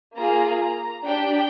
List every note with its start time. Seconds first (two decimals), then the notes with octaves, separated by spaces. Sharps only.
0.17 A#3 F4 G#4 A#5
0.61 A#5
1.05 D4 G4 G5